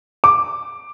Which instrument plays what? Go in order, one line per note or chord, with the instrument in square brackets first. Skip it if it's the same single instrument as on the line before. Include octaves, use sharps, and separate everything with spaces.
[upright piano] D6